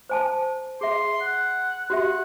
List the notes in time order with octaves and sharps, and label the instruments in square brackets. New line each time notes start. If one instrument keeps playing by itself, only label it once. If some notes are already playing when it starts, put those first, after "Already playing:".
[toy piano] C5 G#5 A5
[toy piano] G#4 E5 [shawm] C6
[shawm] F#5
[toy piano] F#4 G4 E5 [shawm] F#5